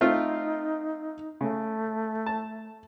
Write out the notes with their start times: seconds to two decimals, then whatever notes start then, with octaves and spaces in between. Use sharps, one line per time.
0.01 A3 C4 D#4 F4
1.41 C#3 A3
2.26 A5